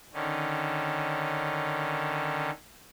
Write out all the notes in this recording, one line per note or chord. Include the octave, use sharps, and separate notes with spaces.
D3 D#3 C#4